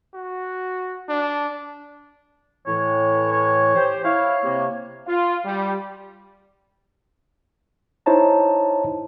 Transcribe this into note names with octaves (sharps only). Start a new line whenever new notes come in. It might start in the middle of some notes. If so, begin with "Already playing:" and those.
F#4
D4
A2 E3 C#5
C#5
G4 C5
E4 C#5 F5
C3 A#3
F4
G3
D#4 E4 C5 C#5 A5 A#5